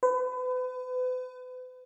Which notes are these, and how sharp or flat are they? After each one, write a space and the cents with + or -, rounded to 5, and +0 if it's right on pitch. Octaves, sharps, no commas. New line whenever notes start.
B4 +35